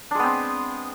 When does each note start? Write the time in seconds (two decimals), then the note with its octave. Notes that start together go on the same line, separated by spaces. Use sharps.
0.11 D4
0.15 G#3
0.19 B3
0.23 C4